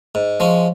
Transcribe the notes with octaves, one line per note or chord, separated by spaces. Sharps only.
G#2
F3 G#3 C#4